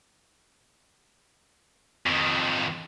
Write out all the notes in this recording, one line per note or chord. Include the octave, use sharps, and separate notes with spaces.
F2 D#3